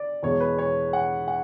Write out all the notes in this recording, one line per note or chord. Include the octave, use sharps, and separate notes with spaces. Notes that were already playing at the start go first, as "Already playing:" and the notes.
Already playing: D5
E2 B2 G#3 C#5
B4
C#5
F#5
F#5